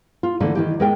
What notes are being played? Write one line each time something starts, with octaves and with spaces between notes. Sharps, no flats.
F4
D3 E3 A3 A#3 D4
D#3 E3 G4
G#3 A#4 G5